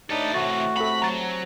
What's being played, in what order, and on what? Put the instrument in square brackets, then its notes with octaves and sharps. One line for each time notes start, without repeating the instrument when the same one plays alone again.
[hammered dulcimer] A2 [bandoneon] D4 D#4 [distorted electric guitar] A4 B4
[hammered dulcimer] A2 A3 C6 [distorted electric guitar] C3 E3 [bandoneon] F#4 [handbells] A6
[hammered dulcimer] C3 [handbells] A4 F#5 [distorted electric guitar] B5
[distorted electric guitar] F#3 [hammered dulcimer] G#5 [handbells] A#5 A6